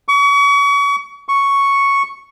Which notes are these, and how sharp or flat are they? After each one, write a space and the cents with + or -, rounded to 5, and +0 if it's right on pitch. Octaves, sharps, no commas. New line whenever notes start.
C#6 +35
C#6 +0